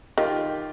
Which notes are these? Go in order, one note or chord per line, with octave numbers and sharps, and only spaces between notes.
D#3 F4 G4